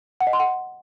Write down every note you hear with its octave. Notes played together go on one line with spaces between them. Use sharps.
F#5
D#5
C6
F#5